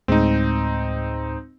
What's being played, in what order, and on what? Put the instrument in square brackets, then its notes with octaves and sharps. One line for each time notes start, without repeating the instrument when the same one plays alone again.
[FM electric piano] D2 A2 G#3 [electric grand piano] C4 D#4